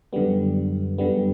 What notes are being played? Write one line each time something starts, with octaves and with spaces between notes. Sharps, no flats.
F#2 D3 G3 B3
F#2 D3 G3 B3